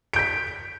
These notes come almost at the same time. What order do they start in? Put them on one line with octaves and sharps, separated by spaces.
D7 G6 B6